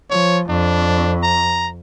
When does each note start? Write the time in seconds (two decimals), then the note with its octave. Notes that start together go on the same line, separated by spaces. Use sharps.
0.11 F3 C#5
0.49 F2 D4
1.23 A#5